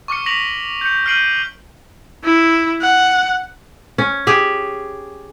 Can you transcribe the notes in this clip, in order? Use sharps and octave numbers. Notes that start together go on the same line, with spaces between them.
C#6 D6 F6 C#7
C#6 A#6 B6 D7 F7 F#7
G6 C#7
F6 G6 C7 D7 D#7 F#7
E4
F#5
C#4
G4 G#4